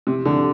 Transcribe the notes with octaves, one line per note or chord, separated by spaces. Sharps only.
C3
D3